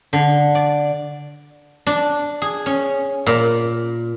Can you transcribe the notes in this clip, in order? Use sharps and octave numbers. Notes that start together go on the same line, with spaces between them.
D3
D5
D4
G#4
C#4
A#2